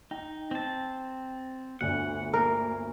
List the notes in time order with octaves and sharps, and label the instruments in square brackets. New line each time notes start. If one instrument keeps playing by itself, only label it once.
[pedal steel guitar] D#4 [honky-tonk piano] G5
[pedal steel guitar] C4 A5
[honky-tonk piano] G1 D2 D4 [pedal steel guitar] F#5
[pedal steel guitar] A#3 [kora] A#4